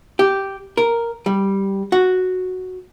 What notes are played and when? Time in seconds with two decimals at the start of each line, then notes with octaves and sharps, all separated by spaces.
0.19 G4
0.77 A#4
1.26 G3
1.92 F#4